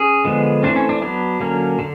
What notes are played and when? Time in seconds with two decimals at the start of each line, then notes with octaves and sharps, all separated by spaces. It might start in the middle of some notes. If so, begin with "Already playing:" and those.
Already playing: C#4 G#4
0.25 D3 F3 G#3 B3
0.63 E3 A3 C4 D4
0.76 C#4
0.89 D4
1.02 F#3 B3 D4
1.40 D3 F#3 A#3 C#4
1.79 D3